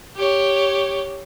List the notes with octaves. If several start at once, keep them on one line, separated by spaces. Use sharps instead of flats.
G4 C#5